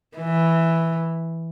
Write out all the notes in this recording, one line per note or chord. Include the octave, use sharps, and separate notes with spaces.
E3